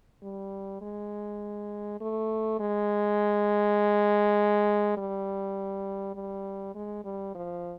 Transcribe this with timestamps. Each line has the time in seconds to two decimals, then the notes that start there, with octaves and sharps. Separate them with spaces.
0.22 G3
0.81 G#3
2.01 A3
2.59 G#3
4.97 G3
6.15 G3
6.75 G#3
7.04 G3
7.35 F3